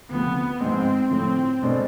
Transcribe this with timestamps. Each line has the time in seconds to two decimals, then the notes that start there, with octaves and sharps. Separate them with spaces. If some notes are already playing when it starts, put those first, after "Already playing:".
0.10 D2 C3 F3 B3
0.61 G#2 F3 G#3 C4
1.11 A2 F3 A3 C4
1.63 B2 G#3 D4 A4 C5